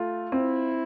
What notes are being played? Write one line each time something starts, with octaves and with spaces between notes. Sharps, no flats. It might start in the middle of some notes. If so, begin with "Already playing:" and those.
Already playing: A3 F4
C4 E4